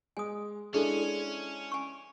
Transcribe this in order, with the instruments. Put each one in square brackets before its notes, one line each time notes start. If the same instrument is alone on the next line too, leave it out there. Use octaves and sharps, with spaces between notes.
[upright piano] G#3 [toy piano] G#5 D#6
[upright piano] G#3 D4 E4 [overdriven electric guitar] C#4 [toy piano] G#4 A4
[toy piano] G#5 C#6